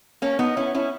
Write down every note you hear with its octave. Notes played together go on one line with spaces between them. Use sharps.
A#3 C#4
B3 D#4
C#4 E4
C#4 E4